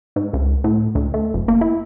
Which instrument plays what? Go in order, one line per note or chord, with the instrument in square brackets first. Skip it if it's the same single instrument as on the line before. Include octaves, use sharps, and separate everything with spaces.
[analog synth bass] G#2
C#2
A2
D2
A3
F#1
A#3
E4